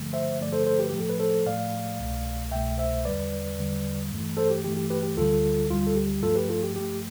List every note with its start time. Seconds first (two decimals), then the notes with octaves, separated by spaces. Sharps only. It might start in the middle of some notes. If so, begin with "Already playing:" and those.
Already playing: G2 D3 F3 A3
0.13 C5 E5
0.40 G2 D3 F3 A3 D5
0.53 A4 C5
0.66 A4 C5
0.79 G4 B4
0.89 A2 F3 A3 G4
1.00 A4
1.09 B4
1.19 A4 C5
1.46 A2 F3 A3 D5 F5
1.99 C2 B2 A3
2.51 C2 B2 A3 E5 G5
2.78 C5 E5
3.05 E2 D3 G3 B4 D5
3.57 E2 D3 G3
4.12 G2 E3 A3
4.37 A4 C5
4.50 G4
4.64 G2 E3 A3 G4
4.77 G4
4.90 G4 B4
5.03 G4
5.17 D2 D3 G3 F4 A4
5.69 D2 D3 G3 F4
5.87 A4
5.96 G4
6.23 G2 F3 A3 F4 A4
6.36 G4 B4
6.49 F4 A4
6.63 G4
6.76 G2 F3 A3 G4